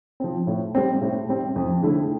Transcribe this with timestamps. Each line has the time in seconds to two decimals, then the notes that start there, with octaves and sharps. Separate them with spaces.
0.20 F3 C4
0.47 A2
0.75 G3 C4
1.01 A2
1.29 G3 C4
1.56 F2
1.83 D3 A3 E4